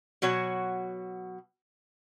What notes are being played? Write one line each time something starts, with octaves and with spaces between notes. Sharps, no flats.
B2 F#3 F#4 C#5